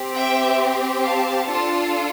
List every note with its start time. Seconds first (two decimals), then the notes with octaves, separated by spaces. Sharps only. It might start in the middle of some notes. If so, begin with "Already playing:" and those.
Already playing: C4 G4
0.16 E5 G5
1.03 F5 A5
1.49 D4 F4 A4 A5 C6